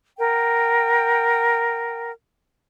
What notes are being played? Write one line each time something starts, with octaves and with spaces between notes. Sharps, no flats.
A#4 F#5 G5